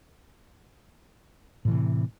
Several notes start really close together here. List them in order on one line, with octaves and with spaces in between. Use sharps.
A2 E3 C3